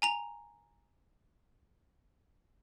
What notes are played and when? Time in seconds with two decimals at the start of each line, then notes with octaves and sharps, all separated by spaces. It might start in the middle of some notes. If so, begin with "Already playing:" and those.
0.02 G#5 A#5 F7